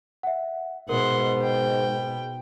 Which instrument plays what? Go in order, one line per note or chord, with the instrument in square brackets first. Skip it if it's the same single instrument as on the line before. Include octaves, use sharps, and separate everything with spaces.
[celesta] E5 F#5
[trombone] G#2 [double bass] B2 [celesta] A#4 [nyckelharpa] F#5 C6
[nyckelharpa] G5